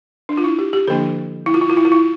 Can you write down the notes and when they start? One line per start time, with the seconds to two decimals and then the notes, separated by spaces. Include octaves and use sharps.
0.29 D4
0.37 F4
0.44 E4
0.59 G4
0.73 G4
0.88 D3 F3 A#3 D4 A4
1.46 E4
1.54 F4
1.62 E4
1.70 F4
1.77 E4
1.85 F4
1.92 E4